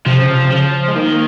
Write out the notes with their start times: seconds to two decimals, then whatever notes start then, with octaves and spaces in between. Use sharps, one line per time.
0.06 C3 F3
0.18 C#3
0.28 C3
0.45 C3
0.51 C#3 F3
0.88 G#3
0.96 D#3 A#3